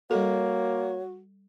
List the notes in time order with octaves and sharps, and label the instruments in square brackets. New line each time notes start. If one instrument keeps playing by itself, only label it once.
[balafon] G3 A4 [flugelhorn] A#3 [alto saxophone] F#4 [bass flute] C#5